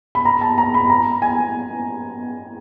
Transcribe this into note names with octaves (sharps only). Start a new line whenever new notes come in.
B5
A#5
A5
A#5
B5
A#5
G#5